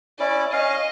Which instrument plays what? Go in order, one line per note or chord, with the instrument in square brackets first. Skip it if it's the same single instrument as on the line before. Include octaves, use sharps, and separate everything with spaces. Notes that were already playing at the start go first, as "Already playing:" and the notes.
[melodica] C#4 E4 [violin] D5
[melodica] C#4 F5 [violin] D#5